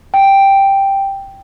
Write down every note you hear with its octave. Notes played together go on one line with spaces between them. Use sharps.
G5